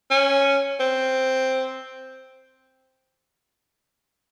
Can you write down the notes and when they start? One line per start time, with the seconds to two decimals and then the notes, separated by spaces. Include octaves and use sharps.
0.11 C#4
0.80 C4